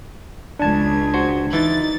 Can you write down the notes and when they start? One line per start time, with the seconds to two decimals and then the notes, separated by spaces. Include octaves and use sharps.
0.59 C#2 D4 A5 G#6
1.14 F#4 C5
1.53 E3 D#4 A6